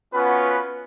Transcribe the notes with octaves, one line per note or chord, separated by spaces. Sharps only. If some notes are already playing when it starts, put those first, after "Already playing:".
B3 C#4 F4 F#4 B4